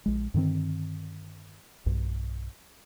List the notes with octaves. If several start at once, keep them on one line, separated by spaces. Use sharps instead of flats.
A#1 G#3
G2 D3 D#3 C4
B1 G2